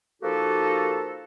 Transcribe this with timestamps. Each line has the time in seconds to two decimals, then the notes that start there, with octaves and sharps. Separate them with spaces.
0.22 F3 A#3 D#4 F#4 G4 A4